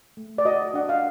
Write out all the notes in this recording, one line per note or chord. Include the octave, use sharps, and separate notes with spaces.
A3
D5
F#4 D#5
D4 F#5
F5